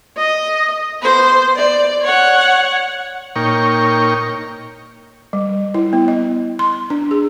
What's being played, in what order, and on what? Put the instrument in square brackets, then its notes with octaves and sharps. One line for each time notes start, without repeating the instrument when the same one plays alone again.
[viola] D#5
B3 C5
D5
C#5 F#5
[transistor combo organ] A#2 D#4 A#4 C#5 G5 C#6
[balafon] G3
E4
B3
D#5
C6
D4
G#4